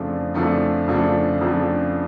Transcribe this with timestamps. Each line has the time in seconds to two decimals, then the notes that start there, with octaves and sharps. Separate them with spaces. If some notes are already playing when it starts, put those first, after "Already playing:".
Already playing: F2 C#3 F3 A3 D4
0.34 F2 C#3 F3 A3 D4
0.87 F2 C#3 F3 A3 D4
1.41 F2 C#3 F3 A3 D4